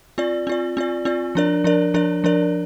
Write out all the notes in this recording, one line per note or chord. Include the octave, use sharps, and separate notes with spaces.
C4 F4 D5
C4 F4 D5
C4 F4 D5
C4 F4 D5
F3 D4 A#4 D5
F3 D4 A#4 D5
F3 D4 A#4 D5
F3 D4 A#4 D5